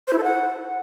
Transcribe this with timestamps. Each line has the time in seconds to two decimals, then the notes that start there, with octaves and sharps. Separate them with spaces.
0.08 C5
0.13 E4
0.18 A4
0.23 F#5